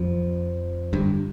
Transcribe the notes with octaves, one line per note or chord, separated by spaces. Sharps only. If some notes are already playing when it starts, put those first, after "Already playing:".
Already playing: F2 F3
G1 G2